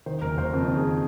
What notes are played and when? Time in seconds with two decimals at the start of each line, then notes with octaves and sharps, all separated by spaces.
0.06 D#3 C5
0.21 F#1 A#4
0.38 F#1 C5
0.53 F2 A#4
0.68 D#3
0.77 G#4